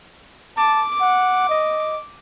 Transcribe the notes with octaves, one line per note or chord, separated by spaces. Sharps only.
A5 D6
F#5
D#5